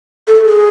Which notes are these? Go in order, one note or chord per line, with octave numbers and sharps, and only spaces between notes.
A4
G#4